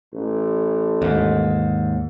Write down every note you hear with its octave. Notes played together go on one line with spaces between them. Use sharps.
A1
D#2 G#2